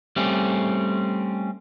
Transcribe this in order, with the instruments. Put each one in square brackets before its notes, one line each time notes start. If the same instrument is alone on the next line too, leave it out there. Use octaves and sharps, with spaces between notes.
[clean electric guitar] G3 A3 C4 C#4